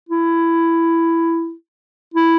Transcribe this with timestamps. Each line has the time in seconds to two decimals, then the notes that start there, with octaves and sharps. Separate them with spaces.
0.09 E4
2.14 E4